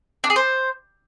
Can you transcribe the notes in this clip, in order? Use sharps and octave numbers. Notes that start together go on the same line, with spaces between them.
D4
G#4
C5